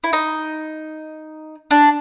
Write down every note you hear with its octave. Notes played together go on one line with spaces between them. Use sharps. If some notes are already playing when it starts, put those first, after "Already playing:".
E4
D#4
D4